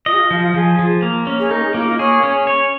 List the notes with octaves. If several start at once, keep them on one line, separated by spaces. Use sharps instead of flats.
F4 D#5
G#4
F4
F3 F4
F4
F3 G#4
F3
A#3
C#4
G#4
D#4 A#4
G#4
A#3 F4
F4
G#4 C#5
C#4
C#5